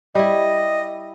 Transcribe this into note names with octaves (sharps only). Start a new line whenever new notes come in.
G3 E4 D#5